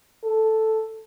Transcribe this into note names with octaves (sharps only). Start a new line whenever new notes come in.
A4